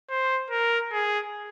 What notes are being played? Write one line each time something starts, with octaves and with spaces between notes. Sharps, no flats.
C5
A#4
G#4